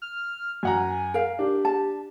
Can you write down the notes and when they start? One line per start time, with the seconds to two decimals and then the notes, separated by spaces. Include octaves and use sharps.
0.02 F6
0.63 F#2 F#5 G#5 A#5
1.14 A#4 F5
1.39 D4 G4
1.65 A5